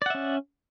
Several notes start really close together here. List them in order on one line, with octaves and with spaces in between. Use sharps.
D5 F#5 E5 C#4